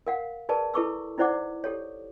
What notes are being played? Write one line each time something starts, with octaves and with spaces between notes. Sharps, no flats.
A#4 F5 F#5
G#4 A#4 B4 D5 A5
E4 A4 B4 C#6 D6 E6
D#4 E4 C5 D5 F#5 D6
G4 A4 C#5